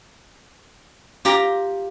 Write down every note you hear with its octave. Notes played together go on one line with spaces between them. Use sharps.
F4 G4 G5 A#5